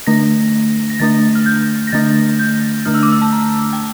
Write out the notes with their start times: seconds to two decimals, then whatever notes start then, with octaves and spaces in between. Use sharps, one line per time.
0.07 D3 A3 D4 A#6
0.90 A#6
1.00 D3 A3 D4 A6
1.35 F6
1.46 G6
1.87 A#6
1.92 D3 A3 D4 A6
2.39 G6
2.85 D3 A3 D4 F6
2.94 E6
3.03 D6
3.12 E6
3.22 A5
3.32 A#5
3.73 G5